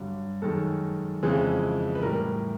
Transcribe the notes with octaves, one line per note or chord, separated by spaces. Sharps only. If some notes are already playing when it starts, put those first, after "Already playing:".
Already playing: G2 D3 F#3
F#2 D#3 G#3 A4
F2 C#3 E3 G#3
B4
A2 E3 G3 A#4